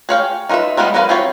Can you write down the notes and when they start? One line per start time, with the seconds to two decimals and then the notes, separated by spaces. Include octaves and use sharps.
0.09 G#4 C#5 F5 G5
0.49 D#4 F4 A#4 B4 E5
0.77 G3 G#3 B3 F4 E5
0.94 F#3 B3 A#4 B4 F5
1.09 C4 E4 F4 G4 C#5